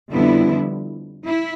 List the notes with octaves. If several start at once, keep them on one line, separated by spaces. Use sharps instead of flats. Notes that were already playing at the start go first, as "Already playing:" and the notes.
F2 D3 G3 B3 E4
E4